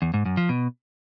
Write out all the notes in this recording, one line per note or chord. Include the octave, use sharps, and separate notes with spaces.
E2
G#2
F#2
F3
B2